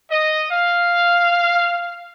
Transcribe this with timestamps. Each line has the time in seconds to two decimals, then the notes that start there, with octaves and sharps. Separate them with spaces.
0.11 D#5
0.51 F5